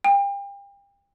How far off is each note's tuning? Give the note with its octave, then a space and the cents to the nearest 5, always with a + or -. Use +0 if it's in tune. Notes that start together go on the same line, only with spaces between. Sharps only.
G5 +35